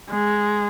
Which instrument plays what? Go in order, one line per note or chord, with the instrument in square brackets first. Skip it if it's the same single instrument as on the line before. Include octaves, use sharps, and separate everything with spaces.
[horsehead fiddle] G#3